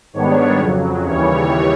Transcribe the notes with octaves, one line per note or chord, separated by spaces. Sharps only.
G#2 D#3 G3 B3 D4 C#5
F2 C#3 F#3
D#2 C#3 E3 G3 C#5